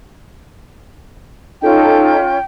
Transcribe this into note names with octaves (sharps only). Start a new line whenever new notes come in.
C#4 D#4 F4 A4 G5